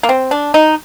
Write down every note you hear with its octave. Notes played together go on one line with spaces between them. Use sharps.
A#3
C4
D4
D#4